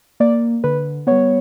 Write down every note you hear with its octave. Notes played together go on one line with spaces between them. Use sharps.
A#3 D5
D3 B4
G3 B3 C#5